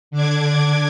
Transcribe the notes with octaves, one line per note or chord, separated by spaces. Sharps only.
D3 D4 D6 G#6